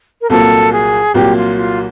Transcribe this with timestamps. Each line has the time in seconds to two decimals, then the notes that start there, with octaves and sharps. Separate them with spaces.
0.21 A#4
0.29 C2 A#2 F#3 A#3 A4
0.72 G#4
1.14 C2 A#2 F#3 A#3 G4
1.36 F4
1.57 F4